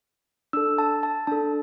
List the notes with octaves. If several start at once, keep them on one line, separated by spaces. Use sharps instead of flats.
D4 A4 E6
A5
A5
D4 A4 A5